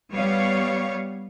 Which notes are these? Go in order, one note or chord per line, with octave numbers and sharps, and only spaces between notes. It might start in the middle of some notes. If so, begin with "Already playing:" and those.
G3 B3 C#5 F5